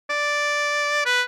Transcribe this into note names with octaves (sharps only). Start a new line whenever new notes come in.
D5
B4